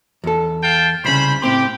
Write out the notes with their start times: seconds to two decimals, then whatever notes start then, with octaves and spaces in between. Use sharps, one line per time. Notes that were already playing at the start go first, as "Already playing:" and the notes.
0.24 E2 A4
0.63 F5 G5 A5
1.04 C2 C#3 C5 B5
1.42 A2 C4 G4 C6